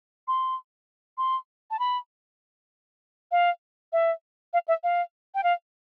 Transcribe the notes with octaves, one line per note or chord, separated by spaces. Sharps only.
C6
C6
A5
B5
F5
E5
F5
E5
F5
G5
F5